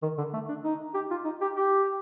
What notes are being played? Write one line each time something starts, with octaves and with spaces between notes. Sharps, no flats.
D#3
D3
A3
D4
D#4
G4
F4
D#4
G4
G4